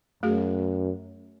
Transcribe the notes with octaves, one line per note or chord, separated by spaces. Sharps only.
F#2 A3 F#4 G#4